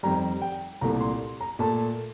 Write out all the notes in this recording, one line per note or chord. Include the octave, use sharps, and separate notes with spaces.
F2 D#3 G3 A#5
G5
C2 A#2 A3 A#5
C6
A#5
A#2 A3 A5